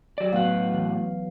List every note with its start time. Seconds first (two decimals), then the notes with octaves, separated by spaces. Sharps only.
0.18 F#3 D5
0.33 A2 F#3 B3 F5 F#5
0.74 E3